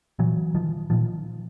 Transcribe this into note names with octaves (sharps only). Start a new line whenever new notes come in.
A#2 E3 F#3
D#3 F3
A#2 D#3 F3